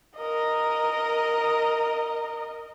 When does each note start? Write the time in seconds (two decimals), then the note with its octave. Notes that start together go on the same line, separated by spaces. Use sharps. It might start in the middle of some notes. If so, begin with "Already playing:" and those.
0.18 A#4 D#5